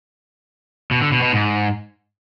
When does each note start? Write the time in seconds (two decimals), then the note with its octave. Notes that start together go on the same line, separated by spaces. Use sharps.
0.91 B2
1.01 D3
1.12 B2
1.22 B2
1.32 G#2